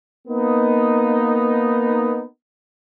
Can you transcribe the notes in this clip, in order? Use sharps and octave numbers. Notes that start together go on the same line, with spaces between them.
A#3 B3 D#4